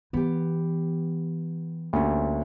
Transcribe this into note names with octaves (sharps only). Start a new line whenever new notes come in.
E3 B3 G4
D2 G3 A#3 C#4